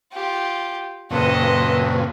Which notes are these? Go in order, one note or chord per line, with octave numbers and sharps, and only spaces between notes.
F4 G4
F#2 A#2 C#3 C4 A4 B4 D#5